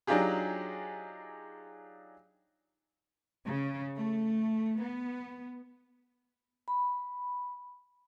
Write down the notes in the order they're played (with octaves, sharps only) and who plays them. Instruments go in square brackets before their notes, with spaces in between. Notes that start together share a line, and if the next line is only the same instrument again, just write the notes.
[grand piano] F#3 D4 D#4 F4 G4 G#4
[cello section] C#3
A3
B3
[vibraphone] B5